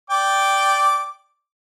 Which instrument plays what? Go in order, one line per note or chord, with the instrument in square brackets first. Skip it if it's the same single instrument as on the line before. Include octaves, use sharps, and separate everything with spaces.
[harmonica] D5 G5 D6